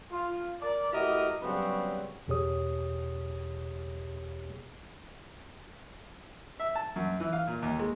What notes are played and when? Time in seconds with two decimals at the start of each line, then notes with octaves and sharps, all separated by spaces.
0.12 F4
0.61 A#4 D5
0.93 A3 E4 F#4 G4 A#4 D#5
1.42 C#3 F#3 G3 B3 C4 F#4
2.28 E2 B2 G4 G#4 C#5 D#6
6.60 E5
6.75 A5
6.96 F#2
7.20 E3
7.33 F5
7.47 A#2
7.62 D#2
7.79 G#3